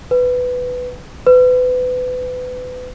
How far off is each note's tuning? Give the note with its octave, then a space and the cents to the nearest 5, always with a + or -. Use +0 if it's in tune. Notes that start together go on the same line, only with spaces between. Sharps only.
B4 +10
B4 +30